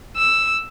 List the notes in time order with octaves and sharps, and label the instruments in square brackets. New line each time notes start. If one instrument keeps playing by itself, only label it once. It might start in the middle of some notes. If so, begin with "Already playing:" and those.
[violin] E6